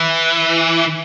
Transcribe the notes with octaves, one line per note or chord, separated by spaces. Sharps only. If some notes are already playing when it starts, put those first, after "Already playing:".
Already playing: E3